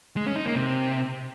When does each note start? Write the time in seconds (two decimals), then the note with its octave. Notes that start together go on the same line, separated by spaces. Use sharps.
0.17 G#3
0.26 C#4
0.36 D#4
0.45 A#3
0.55 C3